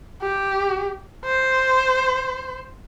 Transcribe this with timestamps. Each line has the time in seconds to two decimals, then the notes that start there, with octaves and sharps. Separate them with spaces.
0.22 G4
1.25 C5